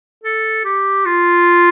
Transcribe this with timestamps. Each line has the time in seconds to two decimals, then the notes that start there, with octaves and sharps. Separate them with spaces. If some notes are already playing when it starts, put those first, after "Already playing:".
0.24 A4
0.65 G4
1.05 F4